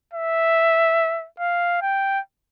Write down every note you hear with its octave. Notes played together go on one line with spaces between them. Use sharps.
E5
F5
G5